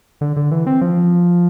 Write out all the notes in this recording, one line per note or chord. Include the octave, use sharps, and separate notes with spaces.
D3
D3
E3
C4
F3